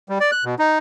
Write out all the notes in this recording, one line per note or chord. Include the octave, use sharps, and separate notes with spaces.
G3
D5
F#6
B2
D#4